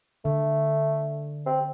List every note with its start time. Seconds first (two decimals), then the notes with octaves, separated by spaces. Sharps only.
0.25 D3 A3
1.46 C4